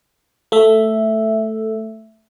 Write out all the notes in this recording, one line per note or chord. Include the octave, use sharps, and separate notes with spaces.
A3 E5